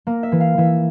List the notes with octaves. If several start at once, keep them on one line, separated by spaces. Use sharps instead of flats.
A#3
E5
E3
F5
E3 E5